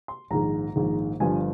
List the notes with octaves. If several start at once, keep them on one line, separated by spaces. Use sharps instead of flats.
C6
A#1 G#2 D#3 A#5
A#1 G#2 D#3
G1 G2 F3 G#5